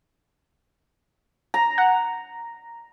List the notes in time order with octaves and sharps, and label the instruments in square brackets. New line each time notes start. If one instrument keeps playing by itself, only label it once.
[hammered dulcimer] A#5
[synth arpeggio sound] F#5